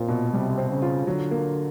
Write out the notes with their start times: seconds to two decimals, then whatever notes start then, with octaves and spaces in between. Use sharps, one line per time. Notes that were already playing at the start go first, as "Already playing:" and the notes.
Already playing: A#2 C4 F4
0.08 B2
0.33 C3 G3
0.58 C4
0.70 C#3
0.82 F4
1.07 D3 F#3
1.31 A#3